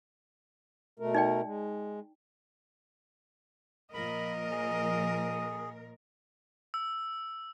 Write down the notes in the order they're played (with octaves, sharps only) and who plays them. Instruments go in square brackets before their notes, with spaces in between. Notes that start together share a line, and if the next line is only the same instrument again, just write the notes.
[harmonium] B2 A3 A#4
[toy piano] D#4 D5 G5
[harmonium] G#3
[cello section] A#2 F3 A#4 [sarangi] D#5 [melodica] B5
[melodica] G#4
[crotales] E6